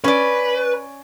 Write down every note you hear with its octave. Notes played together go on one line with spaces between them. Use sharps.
C#4 B4 D5